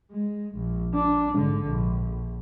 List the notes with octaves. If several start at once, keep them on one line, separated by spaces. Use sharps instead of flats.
G#3
A#1
D4
G#2 D3
A#1